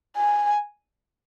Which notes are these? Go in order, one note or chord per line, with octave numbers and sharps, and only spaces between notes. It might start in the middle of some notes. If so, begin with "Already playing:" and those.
G#5